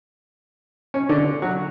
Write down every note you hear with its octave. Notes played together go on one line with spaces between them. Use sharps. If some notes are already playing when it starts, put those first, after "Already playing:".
C#4
D3 D4
F#3 F#4